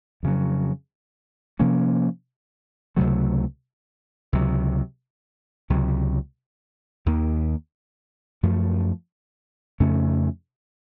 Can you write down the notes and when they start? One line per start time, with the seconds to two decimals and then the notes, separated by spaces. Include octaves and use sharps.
0.23 F2 C#3 F#3
1.59 C3 F3 A#3 C#4
2.96 C#2 C3 F#3 A3
4.33 C#2 C3 F#3
5.70 C#2 C3 F#3
7.06 D#2 D#3 A#3
8.43 F#2 F3 A3
9.80 F2 C#3 A3 C#4